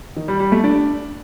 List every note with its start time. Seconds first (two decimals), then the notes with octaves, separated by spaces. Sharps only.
0.16 D#3
0.28 G3
0.40 G3
0.52 A3
0.64 D4